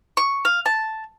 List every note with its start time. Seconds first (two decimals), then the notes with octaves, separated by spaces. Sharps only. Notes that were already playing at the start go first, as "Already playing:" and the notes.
0.17 C#6
0.45 F5
0.66 A5